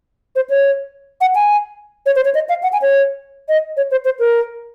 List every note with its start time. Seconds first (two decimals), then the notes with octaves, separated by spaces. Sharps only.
0.36 C5
0.50 C#5
1.21 F#5
1.35 G#5
2.06 C#5
2.16 C5
2.25 C#5
2.35 D#5
2.49 F5
2.63 F#5
2.73 G#5
2.82 C#5
3.49 D#5
3.77 C#5
3.91 C5
4.05 C5
4.19 A#4